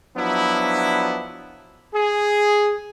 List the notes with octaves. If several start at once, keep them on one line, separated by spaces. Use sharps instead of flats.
F3 F#3 B3 D4 E4
G#4